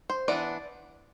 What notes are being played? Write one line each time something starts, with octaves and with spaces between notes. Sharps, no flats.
C5
E3 B3 D4 D5